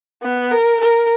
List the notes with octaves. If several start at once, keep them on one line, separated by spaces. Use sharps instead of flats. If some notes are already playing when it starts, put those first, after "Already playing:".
B3
A#4
A#4